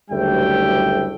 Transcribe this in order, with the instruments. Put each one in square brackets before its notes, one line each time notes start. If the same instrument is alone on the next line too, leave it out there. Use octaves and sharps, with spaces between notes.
[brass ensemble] F#1 D2 G3 A3 E5 G5